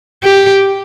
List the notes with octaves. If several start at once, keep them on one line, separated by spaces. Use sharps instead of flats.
G4